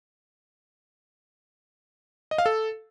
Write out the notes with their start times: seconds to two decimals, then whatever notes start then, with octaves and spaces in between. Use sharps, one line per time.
2.31 D#5
2.38 F5
2.46 A4